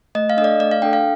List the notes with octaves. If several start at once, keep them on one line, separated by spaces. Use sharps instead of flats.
A3 D#5
F5
D4 A4 D5 D#5
A3 D5
F5
D4 A4 G5
F5